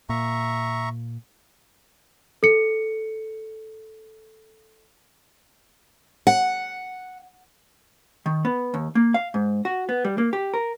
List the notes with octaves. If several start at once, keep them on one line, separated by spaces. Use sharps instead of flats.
A#2 E5 A#5 C#6
A4 C#7
F#5
D#3
B3
D#2
A#3
F5
G#2
F#4
B3
G3
A#3
G4
A#4